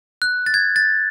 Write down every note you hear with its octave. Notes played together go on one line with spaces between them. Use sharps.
F#6
A6
G#6
A6